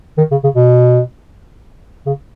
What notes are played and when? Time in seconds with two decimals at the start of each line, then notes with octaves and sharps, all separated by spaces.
0.18 D#3
0.31 C#3
0.44 C#3
0.56 B2
2.06 C#3